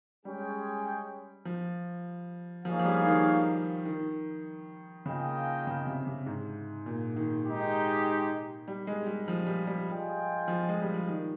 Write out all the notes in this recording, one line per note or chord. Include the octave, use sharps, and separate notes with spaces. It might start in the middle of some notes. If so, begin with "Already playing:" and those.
G3 G#3 C#4 G#4 C#5 G5
F3
F3 A#3 D#4 G#4 C#5 F5
F3
G3
D#3
D#3
C#3 A#3 F4 G#4 D#5 G5
C#3
C3
C3
G#2
A#2
D#3
G#3 D#4 G4
G3
G#3
G3
F3
G3
G3
F4 G#4 D#5 G5
F3
G#3
G3
F3
D#3